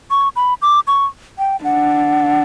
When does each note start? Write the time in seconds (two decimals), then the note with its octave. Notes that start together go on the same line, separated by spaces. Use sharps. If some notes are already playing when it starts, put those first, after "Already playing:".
0.11 C#6
0.36 B5
0.62 D6
0.87 C#6
1.38 G5
1.64 D4 F#5